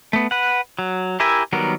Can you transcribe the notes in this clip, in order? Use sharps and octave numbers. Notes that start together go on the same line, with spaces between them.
A3 B3
B4 F#5
F#3
E4 G4 A#4 E5 G#5
D#3 F#3 G3 B3 A#4